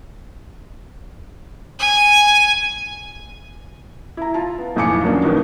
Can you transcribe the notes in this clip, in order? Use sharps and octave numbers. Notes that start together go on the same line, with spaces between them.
G#5
E4 A#5
F4 A5
B3
B1 F2 A2 G#5 D6 C#7
D3 F3 F#3 A#3 C#4 D4
D#2 B2 D#3